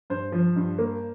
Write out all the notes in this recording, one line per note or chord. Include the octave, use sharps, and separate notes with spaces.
G2 C5
F3
G2
A#3